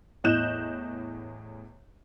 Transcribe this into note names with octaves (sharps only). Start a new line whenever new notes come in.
E2 A2 D#5 F#6 G6 E7